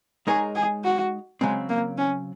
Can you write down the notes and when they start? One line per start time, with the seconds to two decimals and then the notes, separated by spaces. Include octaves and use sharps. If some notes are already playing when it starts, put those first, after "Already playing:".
0.27 G#3 D#4 G#4 A#4 C#5
0.55 G#4
0.84 F#4
1.41 C#3 F#3 G#3 C4
1.69 A#3
1.98 C#4